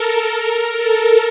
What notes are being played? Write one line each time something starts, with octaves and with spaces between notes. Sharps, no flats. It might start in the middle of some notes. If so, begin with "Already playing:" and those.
Already playing: A4 A#4
A4